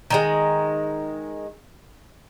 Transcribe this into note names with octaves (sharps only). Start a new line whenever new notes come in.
D#3 G3 G#3